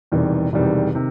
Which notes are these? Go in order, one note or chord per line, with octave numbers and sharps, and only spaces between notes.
E1 E2 C3 D#3 G3
E1 E2 C3 D#3 G3
C3 D#3